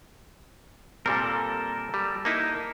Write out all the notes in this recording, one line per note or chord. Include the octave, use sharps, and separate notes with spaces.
A#2 G3 C4 A4 A#4
G3
A#3 D#4 E4